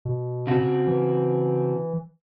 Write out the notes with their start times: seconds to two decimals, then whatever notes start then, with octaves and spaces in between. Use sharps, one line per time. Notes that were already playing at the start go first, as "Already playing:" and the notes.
0.05 B2
0.47 C#3 C4 F#4
0.87 E3